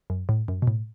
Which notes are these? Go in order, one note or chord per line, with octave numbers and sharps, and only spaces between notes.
F#2
A2
F#2
B2
A2